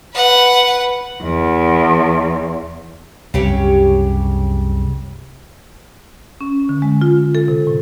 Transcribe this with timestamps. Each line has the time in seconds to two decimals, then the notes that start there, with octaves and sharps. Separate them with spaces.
0.14 B4 F#5
1.21 E2
3.34 C2 F#2 C#3 G4 C#5
6.41 C#4
6.69 D3
6.82 G#3
7.01 F4
7.18 D3
7.35 A4
7.48 C3
7.67 A2